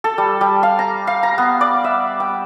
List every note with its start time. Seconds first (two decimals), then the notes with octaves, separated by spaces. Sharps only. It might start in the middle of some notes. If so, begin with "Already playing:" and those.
0.04 A4
0.18 G3
0.41 G3
0.63 F5
0.79 A#5
1.07 F5
1.23 A#5
1.38 B3
1.61 D5
1.84 E5
2.20 G5